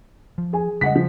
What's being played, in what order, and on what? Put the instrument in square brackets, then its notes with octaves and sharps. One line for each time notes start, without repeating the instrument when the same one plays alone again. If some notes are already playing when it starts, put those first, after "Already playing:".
[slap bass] F3
[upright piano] G#4 G#5
[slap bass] C#3 G3 G#3 [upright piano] D#5 F#5 B6
[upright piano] F3